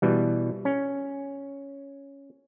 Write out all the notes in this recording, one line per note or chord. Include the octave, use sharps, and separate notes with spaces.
B2 E3 G3
C#4